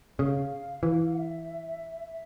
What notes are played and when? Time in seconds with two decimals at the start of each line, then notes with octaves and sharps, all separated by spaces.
0.19 C#3 F5
0.83 E3
1.13 F#5
1.17 E5
2.07 E5